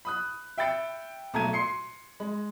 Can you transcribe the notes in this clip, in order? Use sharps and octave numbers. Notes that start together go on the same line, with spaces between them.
B5 D#6 F#6
E5 G5 B5 A6 C#7 D7
B1 A3 A5 A#5 G#6 D#7
C6 C7 C#7
G#3